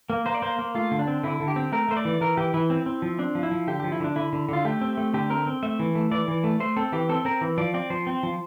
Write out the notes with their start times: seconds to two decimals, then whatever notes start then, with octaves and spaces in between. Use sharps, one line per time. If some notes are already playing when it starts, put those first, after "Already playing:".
0.10 A#3
0.26 A#3 C5
0.35 D5
0.42 A#3 C5
0.59 A#3
0.75 A3 F4
0.91 D3
0.99 D4
1.07 C4
1.23 D3 E4
1.40 D3
1.48 G4
1.56 C4
1.72 A3 A#4
1.89 A3 C5
1.97 D5
2.05 E3
2.21 E3 A#4
2.37 E3 G4
2.54 E3 E4
2.70 C4
2.86 C4
3.02 F3
3.19 C4 D4
3.35 F3
3.43 E4
3.51 F3
3.67 D3 G4
3.80 F3 G4
3.92 E4
4.00 D3 D4
4.16 D3 E4
4.33 D3
4.49 D3 F4
4.65 A3 G4
4.81 C4
4.97 A3
5.14 D3 G4
5.30 C4 A#4
5.46 C4
5.63 A3 E5
5.79 E3
5.95 A3
6.11 E3 D5
6.28 E3
6.44 A3
6.60 A3 C5
6.77 C4 A4
6.92 E3 G4
7.09 C4 A4
7.25 C4 A#4
7.41 E3
7.58 F3 D5
7.74 C4 D5
7.90 F3 C5
8.07 C4
8.23 F3